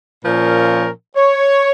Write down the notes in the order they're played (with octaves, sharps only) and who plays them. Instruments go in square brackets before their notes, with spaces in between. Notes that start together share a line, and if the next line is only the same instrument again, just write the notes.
[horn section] A#2 F3 C#4 A#4
C#5